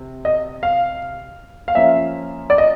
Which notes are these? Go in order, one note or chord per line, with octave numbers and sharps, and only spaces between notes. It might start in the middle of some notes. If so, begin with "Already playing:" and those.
Already playing: C3
D#5
F5
F5
F3 A#3 C#4 E5
D5
D#5